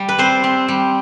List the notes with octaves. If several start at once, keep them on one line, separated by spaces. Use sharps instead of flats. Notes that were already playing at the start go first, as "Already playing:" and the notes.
Already playing: G3
B4
C4 C5
C4
G3